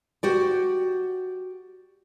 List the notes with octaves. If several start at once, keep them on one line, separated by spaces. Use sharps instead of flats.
F#4 G4 D5